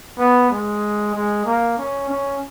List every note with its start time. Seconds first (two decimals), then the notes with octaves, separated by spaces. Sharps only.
0.18 B3
0.50 G#3
1.14 G#3
1.45 A#3
1.78 C#4
2.09 C#4